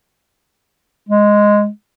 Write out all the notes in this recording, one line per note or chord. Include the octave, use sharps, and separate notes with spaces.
G#3